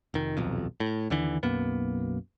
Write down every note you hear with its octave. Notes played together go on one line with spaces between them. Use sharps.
F1 D#3
D#1 B1 F2
A2
D#2 D3 E3
B1 F#2 A#3 B3